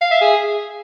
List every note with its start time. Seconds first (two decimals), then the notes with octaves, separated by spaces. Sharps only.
0.01 F5
0.11 E5
0.21 G#4